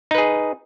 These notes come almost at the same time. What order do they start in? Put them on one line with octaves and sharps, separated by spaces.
D#4 B4 G#4